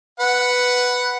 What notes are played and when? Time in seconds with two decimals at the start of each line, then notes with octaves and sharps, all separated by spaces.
0.20 B4 F#5